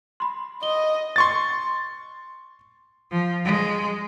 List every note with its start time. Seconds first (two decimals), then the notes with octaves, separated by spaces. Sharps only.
0.20 B5 C6
0.63 D#5 G7
1.16 C6 C#6 A6
3.11 F3
3.45 G#3